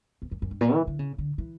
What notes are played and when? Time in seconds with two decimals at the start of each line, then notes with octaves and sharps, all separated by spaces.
0.22 E2
0.31 F#2
0.42 F#2
0.51 G2
0.61 A#2
0.74 E3
0.87 D3
0.99 C#3
1.18 D3
1.38 E3